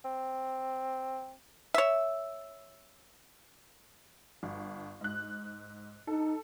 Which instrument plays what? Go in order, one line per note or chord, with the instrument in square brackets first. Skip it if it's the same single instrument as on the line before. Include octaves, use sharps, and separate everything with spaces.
[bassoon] C4
[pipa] C#5 E5
[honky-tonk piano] G1
G#2 F#6
[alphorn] D#4 [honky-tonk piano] A4